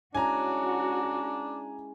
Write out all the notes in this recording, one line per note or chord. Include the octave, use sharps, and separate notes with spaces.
G#3 C#4 D4 E4 F#4 G#5 A#5